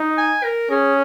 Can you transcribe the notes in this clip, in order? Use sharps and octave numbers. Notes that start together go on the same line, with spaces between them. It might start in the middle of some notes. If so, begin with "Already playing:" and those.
Already playing: D#4
G#5
A#4
C#4 G#4